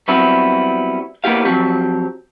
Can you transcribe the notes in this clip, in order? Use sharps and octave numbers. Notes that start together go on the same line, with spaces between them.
F#3 G3 B3 C4 E4
A#3 B3 E4 G4 F5
F3 F#3 C4 G4